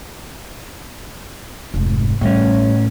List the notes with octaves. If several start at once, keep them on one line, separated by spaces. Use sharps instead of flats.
F1 G#2
A1 A2 G3 C#4